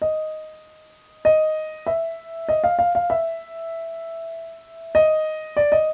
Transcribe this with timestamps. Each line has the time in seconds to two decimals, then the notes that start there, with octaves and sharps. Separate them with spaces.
0.02 D#5
1.25 D#5
1.87 E5
2.49 D#5
2.64 F5
2.79 F5
2.95 F5
3.10 E5
4.95 D#5
5.57 D5
5.72 D#5